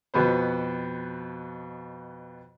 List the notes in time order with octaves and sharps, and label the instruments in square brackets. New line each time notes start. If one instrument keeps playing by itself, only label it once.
[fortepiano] F2 B2 B3 C5